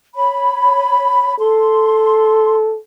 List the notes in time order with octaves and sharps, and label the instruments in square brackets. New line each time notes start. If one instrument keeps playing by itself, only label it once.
[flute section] C#5 B5
[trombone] A4 [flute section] C6